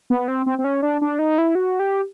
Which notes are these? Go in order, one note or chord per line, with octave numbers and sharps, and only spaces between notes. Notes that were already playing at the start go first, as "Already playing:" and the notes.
B3
C4
C4
C4
C#4
D4
D4
D#4
E4
F#4
G4